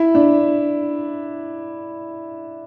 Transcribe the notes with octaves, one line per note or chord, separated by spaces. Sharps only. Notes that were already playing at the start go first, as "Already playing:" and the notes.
Already playing: E4
D4